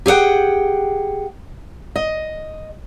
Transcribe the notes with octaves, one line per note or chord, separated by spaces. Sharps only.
G4 G#4 C5 F#5 G5
D#5